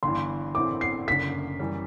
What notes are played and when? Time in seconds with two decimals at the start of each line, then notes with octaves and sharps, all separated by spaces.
0.03 G1 G2 E3 C6
0.55 A2 E3 A3 C4 E4 D6
0.81 C7
1.07 F#1 F#2 D3 B6
1.60 F#2 E3 G3